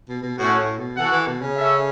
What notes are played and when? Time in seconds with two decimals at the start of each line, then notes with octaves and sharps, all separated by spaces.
0.09 B2
0.23 B2
0.38 A2 A3 C#4 F#4
0.58 A2
0.78 B2
0.97 E3 F#4 A4 F#5
1.12 E3
1.27 B2
1.42 C#3
1.56 C#4 A4 E5